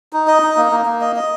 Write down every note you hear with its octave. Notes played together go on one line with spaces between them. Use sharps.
D#4
D#5
D#4
A#3
A#3
A#3
D#5
D#5